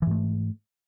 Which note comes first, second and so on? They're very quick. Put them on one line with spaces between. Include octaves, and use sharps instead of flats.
E3 G#2 A3